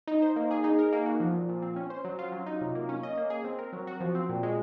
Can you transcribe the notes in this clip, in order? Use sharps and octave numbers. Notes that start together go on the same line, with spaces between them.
D#4
C5
A#3
G#4
D#4
A#4
A#3
F#4
F3
A#2
A#2
C4
C#4
C5
F#3
F4
F#3
D#4
C3
A#3
C#4
D#5
A#3
G#4
C4
A#4
F#3
F#4
F3
C4
A#2
G#3